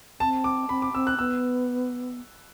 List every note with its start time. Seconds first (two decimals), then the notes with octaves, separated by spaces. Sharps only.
0.20 C4 A5
0.44 D6
0.69 C4 B5
0.82 D6
0.93 C4 E6
1.07 F#6
1.18 B3 E6